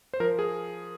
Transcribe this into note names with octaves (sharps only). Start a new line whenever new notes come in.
C5
F3 A#4
G#4